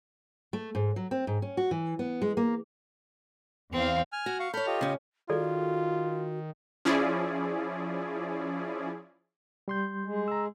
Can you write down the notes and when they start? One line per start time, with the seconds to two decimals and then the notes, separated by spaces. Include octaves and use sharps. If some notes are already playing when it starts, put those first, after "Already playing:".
0.53 A3
0.75 G#2
0.96 F#3
1.11 C4
1.27 G#2
1.42 C#4
1.57 F#4
1.71 E3
1.99 B3
2.22 G#3
2.37 A#3
3.73 E2 C4 F5
4.12 G#5 F6
4.26 F#4
4.40 F5 C#6
4.54 A4 C#5 B5 F6 G6
4.67 F4 G4 D#5
4.81 C#3 C#4
5.30 D#3 F4 F#4 G#4 A4 D5
6.85 F3 C#4 E4 G#4 D5
9.68 G3 C6 G6
10.04 G#3
10.28 A#5 E6